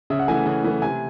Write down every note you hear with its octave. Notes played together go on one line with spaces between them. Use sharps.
C#3 E5
F#5
E3 A3 G#5
C#3
E3 A3
C3 G#5